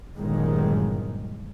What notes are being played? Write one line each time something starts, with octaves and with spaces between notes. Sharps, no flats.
G1 F#2 A#2 D#3 G#3